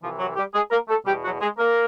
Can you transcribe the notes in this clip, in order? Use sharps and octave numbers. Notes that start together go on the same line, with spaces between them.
C2 C3 E3 F3 F4
F#3 F#4
G3 G4
G#3 G#4
A#3 A#4
A3 A4
E2 B2 G3 G4
F#3 F#4
G#3 G#4
A#3 A#4